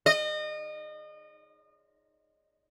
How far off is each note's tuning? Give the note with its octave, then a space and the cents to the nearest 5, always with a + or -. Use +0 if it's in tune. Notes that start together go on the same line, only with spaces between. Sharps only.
D#5 -30